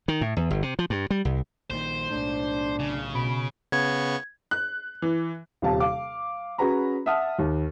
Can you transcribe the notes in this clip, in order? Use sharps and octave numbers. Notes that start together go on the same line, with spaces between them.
D#3
A2
E2
G1
C3
F3
G2
G3
C2
A#1 A#2 D#3 C5
B1 A2 D4
C#3
B2 B5 D7
C#3 B3 C#6 G#6
F#6
E3
D#1 C3 F5 A5
F5 D6
C#4 F#4 G#4 B4 A#5 B5
E5 F#5 A5 D#6 F6
D#2